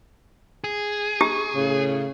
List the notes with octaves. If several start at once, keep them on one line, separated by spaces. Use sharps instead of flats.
G#4
G4
A2 C#3